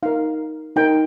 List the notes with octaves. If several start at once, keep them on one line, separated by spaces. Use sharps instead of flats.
D#4 A#4 F5
D#4 A#4 G5